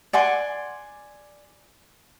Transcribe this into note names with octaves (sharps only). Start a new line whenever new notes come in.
D5 F#5 G#5 C6